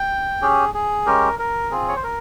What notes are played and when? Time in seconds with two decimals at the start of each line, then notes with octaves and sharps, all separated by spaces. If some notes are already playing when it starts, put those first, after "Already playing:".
Already playing: G5
0.42 C#4 G4 G#4
0.74 G#4
1.06 G#3 C#4 G4 A#4
1.39 A#4
1.71 C4 F4 G#4
1.88 C#5
1.96 C5
2.04 A#4